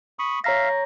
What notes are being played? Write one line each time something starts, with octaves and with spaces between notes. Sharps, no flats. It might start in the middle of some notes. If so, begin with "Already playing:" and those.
B5 C#6 D#6
C#5 E5 F5 A#5 A#6